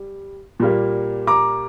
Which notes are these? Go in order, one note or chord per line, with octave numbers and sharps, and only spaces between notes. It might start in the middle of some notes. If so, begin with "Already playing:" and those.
Already playing: G3
A#2 G3 A#3
A#5 D6